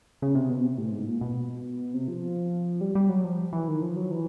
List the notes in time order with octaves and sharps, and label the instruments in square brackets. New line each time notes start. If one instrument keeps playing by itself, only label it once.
[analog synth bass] C#3
C3
B2
C3
A2
G#2
A#2
B2
C3
F3
G3
G3
F#3
F3
E3
D#3
F3
F#3
E3